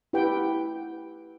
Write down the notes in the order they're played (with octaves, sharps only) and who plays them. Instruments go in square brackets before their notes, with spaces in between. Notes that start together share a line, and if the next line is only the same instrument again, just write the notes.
[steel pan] E4 G4 B4 F#5 G5